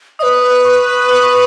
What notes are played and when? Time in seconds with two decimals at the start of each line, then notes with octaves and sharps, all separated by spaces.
0.19 D#5 D#6
0.23 B4
0.65 C#6
1.11 D#6
1.23 C#6